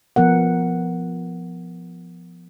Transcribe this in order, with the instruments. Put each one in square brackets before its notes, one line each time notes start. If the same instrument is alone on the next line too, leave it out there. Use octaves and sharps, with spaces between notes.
[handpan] F3 B3 A#4 F#5